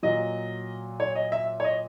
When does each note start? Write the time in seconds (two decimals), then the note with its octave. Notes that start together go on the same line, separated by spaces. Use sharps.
0.03 A#2 F#3 D#5
1.00 C#5
1.15 D#5
1.32 E5
1.60 C#5
1.64 D#5